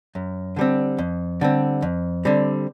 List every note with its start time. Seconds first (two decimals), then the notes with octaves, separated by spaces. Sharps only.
0.15 F#2
0.56 D3 G3 C4
0.98 F2
1.41 D3 G3 C4
1.82 F2
2.25 D3 G3 C4